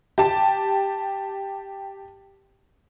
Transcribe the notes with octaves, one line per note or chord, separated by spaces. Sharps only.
G4 A5